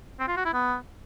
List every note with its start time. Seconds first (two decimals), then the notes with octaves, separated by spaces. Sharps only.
0.19 C4
0.28 F4
0.36 F#4
0.45 E4
0.53 B3